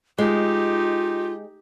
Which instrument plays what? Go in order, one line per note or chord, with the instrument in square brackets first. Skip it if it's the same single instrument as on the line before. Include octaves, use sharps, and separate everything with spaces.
[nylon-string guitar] G#3 [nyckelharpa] D#4 G4 [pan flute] F4